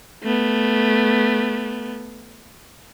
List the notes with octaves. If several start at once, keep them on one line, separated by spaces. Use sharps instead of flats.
A3 B3